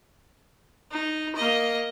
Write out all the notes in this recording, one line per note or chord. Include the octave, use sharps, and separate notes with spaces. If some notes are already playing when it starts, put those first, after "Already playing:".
D#4
A#3 D#5